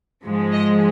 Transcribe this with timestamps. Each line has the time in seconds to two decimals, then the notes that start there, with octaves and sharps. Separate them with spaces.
0.25 G#2 F3 G#3
0.53 D#5